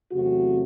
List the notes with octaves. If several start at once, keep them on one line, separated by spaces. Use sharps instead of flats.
E2 C3 F#3 A3 C4 F#4